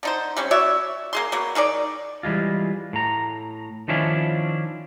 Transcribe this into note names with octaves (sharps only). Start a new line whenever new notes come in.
D3 D#4 C5
G3 C4 C#4
F#4 C#5 D5 E5
A#3 G#4 C6
F#3 A#3 B3
D#3 D#4 G#4 D5
E3 G3 G#3 F4
A2 A#5
D#3 F3 C#4 D4 E4 F4